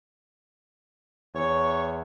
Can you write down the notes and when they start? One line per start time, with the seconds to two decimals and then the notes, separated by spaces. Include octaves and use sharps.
1.35 E2 C#5